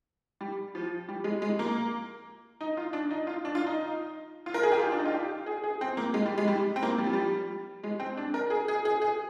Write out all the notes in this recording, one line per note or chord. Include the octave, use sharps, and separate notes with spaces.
G3
F3
G3
G#3
G#3
A#3
D#4
F4
D4
D#4
F4
D4
F4
D#4
F4
A#4
G#4
G4
F4
D4
D#4
F4
G4
G#4
G#4
C4
A#3
G#3
G3
G#3
G3
C4
A#3
G3
F3
G3
G#3
C4
D4
A#4
G#4
G#4
G#4
G#4